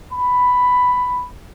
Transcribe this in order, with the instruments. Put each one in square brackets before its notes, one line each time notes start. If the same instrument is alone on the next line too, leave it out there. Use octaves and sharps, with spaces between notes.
[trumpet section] B5